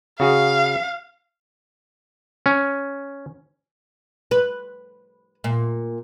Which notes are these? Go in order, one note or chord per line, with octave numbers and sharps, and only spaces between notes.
C#3 F#4 G#4 F5
C#4
B4
A#2